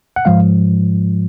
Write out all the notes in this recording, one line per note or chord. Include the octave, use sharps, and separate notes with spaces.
F#5
G#2 F3 G#3 F5